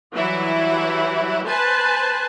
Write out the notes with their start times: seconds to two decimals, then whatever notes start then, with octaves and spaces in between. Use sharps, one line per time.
0.13 E3 F#3 G3 E4
1.46 B4 C5 G#5 A5